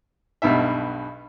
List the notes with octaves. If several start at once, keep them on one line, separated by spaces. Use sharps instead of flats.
B1 G2 B2 D#4 E5